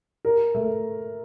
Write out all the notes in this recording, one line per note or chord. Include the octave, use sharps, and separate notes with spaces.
A#4
A3